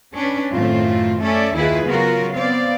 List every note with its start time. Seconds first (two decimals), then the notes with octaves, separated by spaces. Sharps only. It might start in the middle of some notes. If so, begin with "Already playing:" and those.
0.15 C#4 D4 B4
0.52 F#2 A2 D#3 A3 C4 F4
1.21 A3 C#4 A4 D5 E5
1.54 D#2 D#3 E4 F4 G#4 B4
1.87 C#3 F#3 B3 F4 F#4 A#4
2.35 B3 C4 D5 F5